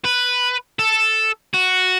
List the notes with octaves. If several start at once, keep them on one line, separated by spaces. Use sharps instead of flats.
B4
A4
F#4